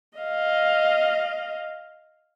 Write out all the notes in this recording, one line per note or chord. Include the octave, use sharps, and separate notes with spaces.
D#5 F5